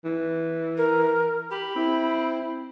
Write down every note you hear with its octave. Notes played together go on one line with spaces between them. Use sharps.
E3
A#4
G4 B5
C4 E4